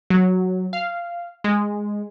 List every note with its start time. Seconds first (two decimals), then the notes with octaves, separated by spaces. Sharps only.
0.10 F#3
0.73 F5
1.44 G#3